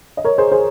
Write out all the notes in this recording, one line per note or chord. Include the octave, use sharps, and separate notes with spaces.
D#5
A#4 C#5
G#4 C5
G#4 C5